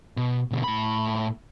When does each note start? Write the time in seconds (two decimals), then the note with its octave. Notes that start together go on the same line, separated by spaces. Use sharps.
0.17 B2
0.51 B2 D3
0.64 A2 B5